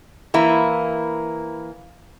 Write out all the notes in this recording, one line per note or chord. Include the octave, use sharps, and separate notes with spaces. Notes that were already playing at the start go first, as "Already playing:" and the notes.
E3 A#3 E4